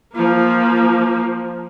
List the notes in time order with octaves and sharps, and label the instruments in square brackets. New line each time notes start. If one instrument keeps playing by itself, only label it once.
[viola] F3 A#3